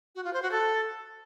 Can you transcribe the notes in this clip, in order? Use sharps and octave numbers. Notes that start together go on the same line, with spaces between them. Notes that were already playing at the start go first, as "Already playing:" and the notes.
F#4
F4
C5
F#4
A4